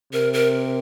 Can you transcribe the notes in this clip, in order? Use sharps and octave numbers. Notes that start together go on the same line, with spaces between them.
C3 A#4
A#4